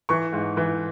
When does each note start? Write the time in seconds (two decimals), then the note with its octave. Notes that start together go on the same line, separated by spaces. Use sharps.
0.09 E3 C#6
0.33 G#2
0.57 E3